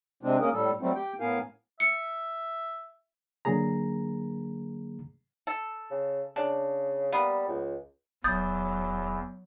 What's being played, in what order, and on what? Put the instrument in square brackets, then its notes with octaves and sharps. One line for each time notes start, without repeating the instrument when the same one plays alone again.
[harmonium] C3 G#3 C4 D4
A#3 C#4 G#4 A#4
A2 G3 A4
F#3 G3 A3 C4
G4 G5
A2 B3 A#4 F5 G#5
[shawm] E5 [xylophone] C#7
[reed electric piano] D3 F#3 A#3 G#4 A#5
[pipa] A4
[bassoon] C#3
[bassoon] C#3 [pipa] D4
[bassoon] G3 [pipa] A#3 B3
[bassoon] C#2
[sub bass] D1 [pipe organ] E2 [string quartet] F#3 [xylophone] D#6 G6 A6